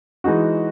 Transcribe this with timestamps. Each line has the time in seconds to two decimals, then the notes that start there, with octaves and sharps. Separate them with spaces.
0.24 E3 G#3 D#4 F#4